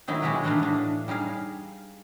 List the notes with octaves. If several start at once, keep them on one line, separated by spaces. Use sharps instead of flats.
D#3 F#3 D#4 E4
G#3 E4 F#4 G4 B4
E3 G3 A3 D4 D#4 F5
A2 D4
G3 D#4 G#4 F5